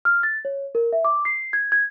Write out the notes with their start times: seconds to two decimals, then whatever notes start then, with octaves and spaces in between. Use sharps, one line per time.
0.05 F6
0.23 A6
0.45 C#5
0.75 A#4
0.93 E5
1.05 D6
1.25 C7
1.53 G#6
1.72 G#6